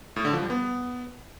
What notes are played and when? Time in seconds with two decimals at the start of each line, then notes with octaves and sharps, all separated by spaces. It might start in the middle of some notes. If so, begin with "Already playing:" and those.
0.16 A2
0.25 D3
0.33 F3
0.41 G3
0.50 B3